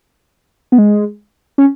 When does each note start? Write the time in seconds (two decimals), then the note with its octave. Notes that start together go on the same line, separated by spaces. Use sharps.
0.72 B3
0.78 G#3
1.58 C#4